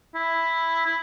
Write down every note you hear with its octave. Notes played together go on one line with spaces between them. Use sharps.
E4
E4